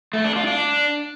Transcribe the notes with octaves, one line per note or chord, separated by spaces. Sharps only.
A3
D4
F4
D4